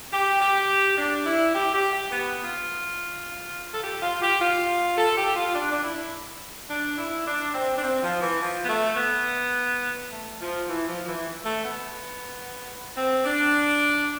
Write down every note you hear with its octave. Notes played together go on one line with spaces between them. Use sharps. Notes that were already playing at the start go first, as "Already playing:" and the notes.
G4
G4
D4
E4
G4
G4
G4
B3
F4
A4
G4
F4
G4
F4
A4
G4
F4
D4
D4
E4
D4
E4
D4
C4
D4
C4
F3
E3
F3
B3
A3
B3
A3
F3
E3
F3
E3
A3
B3
C4
D4